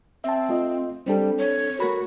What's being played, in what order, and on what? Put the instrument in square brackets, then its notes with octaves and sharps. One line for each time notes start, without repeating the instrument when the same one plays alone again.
[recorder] C4 [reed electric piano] E5 A5
[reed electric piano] A3 F4 D#5
[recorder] G3 [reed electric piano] C4 D4 A4
[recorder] C#5
[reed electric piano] A3 A#4 B5 [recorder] F#4